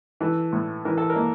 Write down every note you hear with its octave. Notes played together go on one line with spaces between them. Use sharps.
E3 A4
A2
E3 A#4
A4
A#4
A#3